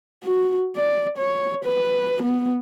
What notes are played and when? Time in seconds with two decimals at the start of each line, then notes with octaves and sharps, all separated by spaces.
0.24 F#4
0.77 D5
1.18 C#5
1.64 B4
2.23 B3